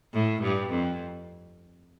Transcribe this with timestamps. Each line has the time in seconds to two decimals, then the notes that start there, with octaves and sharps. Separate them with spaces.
0.13 A2
0.42 G2
0.70 F2